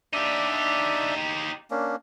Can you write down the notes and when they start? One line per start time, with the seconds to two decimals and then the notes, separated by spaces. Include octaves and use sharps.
0.13 D4 D#4 G4 D5 E5
1.71 A#3 C#4 D4